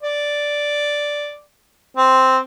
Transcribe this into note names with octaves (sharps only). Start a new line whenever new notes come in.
D5
C4